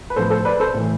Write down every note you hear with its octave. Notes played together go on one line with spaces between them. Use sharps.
B4
A2 F3 A4 C5
A4 C5
B4 D5
A4 C5
A2 E3